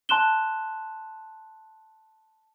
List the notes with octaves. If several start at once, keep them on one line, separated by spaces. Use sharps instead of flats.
A5 C6 F#6 E7 G7